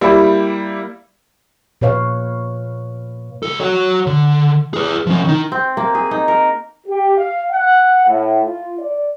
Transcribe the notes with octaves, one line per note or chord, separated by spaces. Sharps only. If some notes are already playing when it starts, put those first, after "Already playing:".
G3 A#3 E4
A#2 B4 C#5 F5
C#2 A4
F#4 C#5
D3
G#4 B4
F3 C#4
D#3 D#4
C4
A#3
G#4
D#4
A#4
G4
F5
F#5
A2
F4
D5